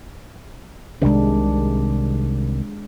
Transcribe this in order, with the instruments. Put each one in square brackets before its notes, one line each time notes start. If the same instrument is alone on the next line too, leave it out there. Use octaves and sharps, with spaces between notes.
[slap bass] C2 C3 D#3 [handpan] G#3 D4